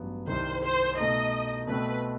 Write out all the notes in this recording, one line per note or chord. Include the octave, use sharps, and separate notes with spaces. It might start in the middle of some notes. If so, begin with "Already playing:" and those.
Already playing: A1 G2 F#3 B3
C2 C3 D#3 C5
C5
B2 A3 D#4 D#5
B2 A3 C4 B4